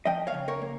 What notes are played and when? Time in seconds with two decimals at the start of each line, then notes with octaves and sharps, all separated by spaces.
0.05 F3 D#5 G5
0.27 C#5 F5
0.34 C#3
0.48 A#4 C#5
0.62 A#3